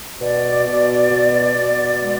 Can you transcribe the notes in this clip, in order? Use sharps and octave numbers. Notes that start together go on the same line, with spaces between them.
B2 D5
B2
B2
B2
G#3